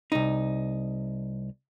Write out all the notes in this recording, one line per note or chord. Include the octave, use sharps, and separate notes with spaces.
C2 D#4